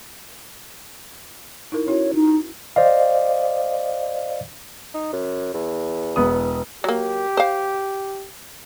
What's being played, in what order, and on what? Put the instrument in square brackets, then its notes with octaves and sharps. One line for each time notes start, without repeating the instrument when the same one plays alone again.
[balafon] D#4 E4 A#4
[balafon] C#4 E4 F#4 [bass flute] C#5
[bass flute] D#4
[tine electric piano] C5 D5 D#5 F5
[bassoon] D#4
F#2
E2
[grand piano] E1 B3 D#6
[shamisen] F#3 A#3 [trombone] G4
[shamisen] C5 F5